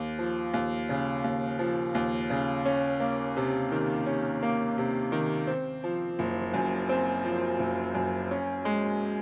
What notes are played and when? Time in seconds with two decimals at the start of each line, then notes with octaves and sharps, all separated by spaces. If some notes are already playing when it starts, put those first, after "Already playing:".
Already playing: D#2
0.19 F3
0.54 D#2
0.89 C#3
1.24 D#2
1.59 F3
1.95 D#2
2.30 C#3
2.66 C#4
3.00 A#3
3.37 C3
3.72 D#3
4.06 C#4
4.43 A#3
4.78 C3
5.12 D#3
5.47 C4
5.84 F3
6.19 F#1
6.54 F#2
6.89 C4
7.25 F3
7.59 F#1
7.95 F#2
8.31 C#4
8.65 G#3